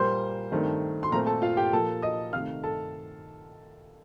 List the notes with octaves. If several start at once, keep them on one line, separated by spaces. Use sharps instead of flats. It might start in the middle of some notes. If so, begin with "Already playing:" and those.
Already playing: A#2 G3 A#3 C5 C6
G2 D#3 A3 C4
C6
A#2 A3 C4 A#4 A#5
A4 A5
F4 F5
G4 G5
A#2 F3 A#3 A4 A5
D#5 D#6
C3 D#3 A3 F5 F6
A4 A5